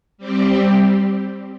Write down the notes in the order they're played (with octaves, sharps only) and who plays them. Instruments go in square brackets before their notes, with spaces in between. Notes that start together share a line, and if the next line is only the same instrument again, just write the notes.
[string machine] G3 C4 G4